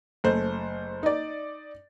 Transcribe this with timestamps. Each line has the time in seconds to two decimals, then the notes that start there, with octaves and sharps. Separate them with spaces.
0.24 F#1 A3 C5
1.03 D#4 D5